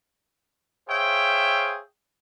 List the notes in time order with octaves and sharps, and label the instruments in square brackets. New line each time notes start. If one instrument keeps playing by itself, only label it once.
[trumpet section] G#4 C5 C#5 E5 F5 G5